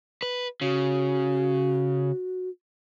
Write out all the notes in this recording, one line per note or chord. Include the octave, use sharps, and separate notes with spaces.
B4
C#3 F#4